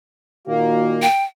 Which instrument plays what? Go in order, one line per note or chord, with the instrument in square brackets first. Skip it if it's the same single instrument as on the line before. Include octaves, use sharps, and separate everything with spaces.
[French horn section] A#2 D#3 F#4 [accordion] A#3
[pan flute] G5